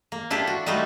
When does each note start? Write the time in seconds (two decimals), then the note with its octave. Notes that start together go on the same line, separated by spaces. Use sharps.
0.12 A#3
0.30 D4 E4 F4 G4 A4
0.47 F#4
0.66 G3 A3 D#4 F4 F#4